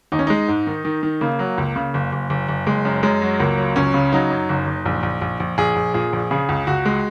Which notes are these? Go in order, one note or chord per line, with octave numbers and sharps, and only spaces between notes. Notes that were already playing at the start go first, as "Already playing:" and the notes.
D#2 D#4
C#4
G#3 D#4
G#2
D#3
D#3
D#3
C#3 A#3
F#3
C#2
C#3
F#1
F#1
F#1
F#1
F#1 G#3
F#2
F#2 G#3
F#3
C#2 A#3
F#3
C#2 C#4
C#3
F#3 D#4
F#2
F#1
F#1
A#1
A#1
A#1
A#1
A#1 G#4
A#1
A#2 G#4
A#1
C#3 G#4
C#2
C#2 F#4
G#3